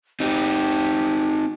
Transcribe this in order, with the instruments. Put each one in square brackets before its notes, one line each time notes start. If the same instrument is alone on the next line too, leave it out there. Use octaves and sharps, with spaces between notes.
[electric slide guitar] C4 D#4 [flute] G4